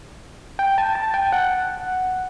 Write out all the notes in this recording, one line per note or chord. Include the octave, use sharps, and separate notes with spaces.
G5
A5
A5
G5
F#5